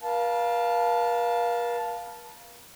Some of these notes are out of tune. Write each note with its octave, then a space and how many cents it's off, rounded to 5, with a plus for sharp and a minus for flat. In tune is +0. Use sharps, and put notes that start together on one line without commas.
A#4 +45 F5 +0 A5 -5